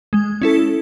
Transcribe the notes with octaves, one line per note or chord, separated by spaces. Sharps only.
G#3
C#4 E4 A4